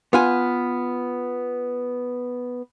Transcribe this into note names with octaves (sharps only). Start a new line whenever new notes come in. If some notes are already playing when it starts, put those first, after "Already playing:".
B3 F4 G#5